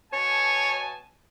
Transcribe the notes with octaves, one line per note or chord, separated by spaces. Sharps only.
B2 C#5 G#5 A5